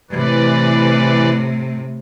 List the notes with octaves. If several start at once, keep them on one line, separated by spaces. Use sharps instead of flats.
A2 C3 E3 B4 D5